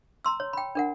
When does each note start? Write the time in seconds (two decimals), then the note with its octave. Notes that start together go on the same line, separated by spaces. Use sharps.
0.25 A#5 C6 E6
0.40 C#5
0.53 G5 B5
0.75 D4 A#4 F#5